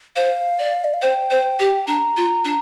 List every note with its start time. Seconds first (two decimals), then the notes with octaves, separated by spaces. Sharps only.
0.16 C5 F5
0.59 D5
0.84 D5
0.94 F5
1.02 C5 G5
1.31 C5
1.59 G4
1.87 D4 A#5
2.17 F4
2.45 D4